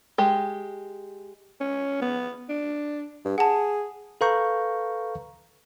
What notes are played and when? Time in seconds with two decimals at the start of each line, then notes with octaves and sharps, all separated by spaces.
0.18 G#3 G4
1.61 C#4
2.01 B3
2.49 D4
3.25 G2
3.38 G#4 F#5 A5
4.21 A4 B4 F5 A#5 C#6 G6